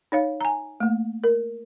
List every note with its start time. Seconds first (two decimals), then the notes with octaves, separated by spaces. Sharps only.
0.12 D#4 C#5 F5
0.41 G#5 A#5
0.80 A3 A#3
1.24 A#4